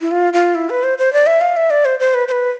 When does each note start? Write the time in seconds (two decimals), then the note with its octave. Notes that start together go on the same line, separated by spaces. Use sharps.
0.01 E4
0.11 F4
0.33 F4
0.55 E4
0.70 B4
0.83 C5
0.98 C5
1.13 D5
1.27 E5
1.41 F5
1.57 E5
1.70 D5
1.85 C5
2.00 C5
2.14 B4
2.28 C5
2.32 B4